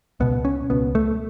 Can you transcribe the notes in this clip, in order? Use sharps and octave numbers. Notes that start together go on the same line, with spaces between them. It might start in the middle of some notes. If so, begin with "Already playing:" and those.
C#2 B2 B3
C#4
C#2 B2 B3
A3